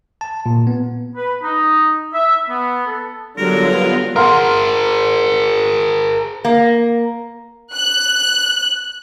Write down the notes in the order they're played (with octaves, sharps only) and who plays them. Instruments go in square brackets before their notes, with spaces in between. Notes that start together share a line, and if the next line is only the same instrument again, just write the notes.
[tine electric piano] A5
A#2
B3
[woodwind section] B4
D#4
E5
B3
A4
[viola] D3 F#3 [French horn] G3 [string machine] B3 F4 [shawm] A#4
[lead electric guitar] G#4 A#4 [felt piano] F#5 C6 F6
[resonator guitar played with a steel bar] A#3
[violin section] F#6